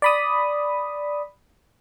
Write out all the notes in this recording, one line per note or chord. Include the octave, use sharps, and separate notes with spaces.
D5 B5 D#6